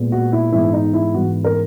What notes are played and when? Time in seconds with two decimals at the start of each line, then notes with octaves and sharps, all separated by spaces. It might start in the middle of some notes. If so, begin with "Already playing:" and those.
Already playing: A#2 G#3 B3
0.12 F#4
0.32 E4
0.52 G#2 E3 G#3 B3 E4
0.73 D#4
0.93 E4
1.14 G#2 E3 G#3 B3 F#4
1.44 A#4